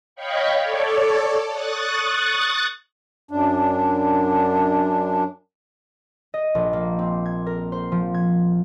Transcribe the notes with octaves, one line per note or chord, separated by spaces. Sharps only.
C#5 D#5 F5 G5 B5 C#6
A4 C#5 D5
C#6 D#6 F#6 A6
F#2 D4
D#5
A#1
A#3
C4
G#6
A#4
C5
F3
G#6